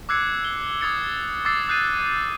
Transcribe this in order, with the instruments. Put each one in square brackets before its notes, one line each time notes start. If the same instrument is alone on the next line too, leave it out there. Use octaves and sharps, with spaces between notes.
[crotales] D6 E6 F#6 G#6 C7 C#7
G7
D6 D#6 G#6 A6 C#7
D6 E6 A6 C7
D#6 F#6 G6 C7 D#7